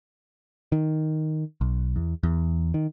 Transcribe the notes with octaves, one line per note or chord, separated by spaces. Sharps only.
D#3
B1
E2
E2
D#3